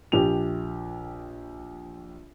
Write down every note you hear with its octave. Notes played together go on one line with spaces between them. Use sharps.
A#1 G4 F7